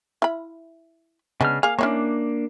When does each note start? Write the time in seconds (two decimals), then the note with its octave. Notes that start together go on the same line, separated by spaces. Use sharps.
0.22 E4 B5
1.41 C#3 G#3 B3 D4 F6
1.63 A#3 G#4 F5
1.79 A#3 C#4 D4 E4 C#5